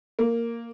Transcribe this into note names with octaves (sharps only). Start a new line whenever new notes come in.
A#3